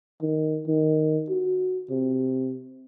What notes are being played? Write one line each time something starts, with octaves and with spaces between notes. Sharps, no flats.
D#3
D#3
F#4
C3